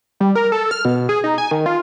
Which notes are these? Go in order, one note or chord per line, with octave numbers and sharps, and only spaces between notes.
G3
A#4
A4
F6
B2
G#4
D#4
G#5
D#3
F4